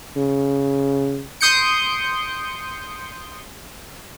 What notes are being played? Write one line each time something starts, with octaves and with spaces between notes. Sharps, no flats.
C#3
C6 D#6 G6 C#7 D7